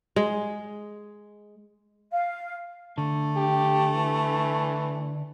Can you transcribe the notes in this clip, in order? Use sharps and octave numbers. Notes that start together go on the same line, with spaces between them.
G#3
F5
D3 A3
G4
E3